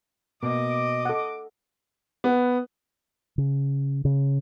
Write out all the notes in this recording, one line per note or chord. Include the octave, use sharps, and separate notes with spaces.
B2 A#3 D#5 D6
A4 F#5
B3
C#3
C#3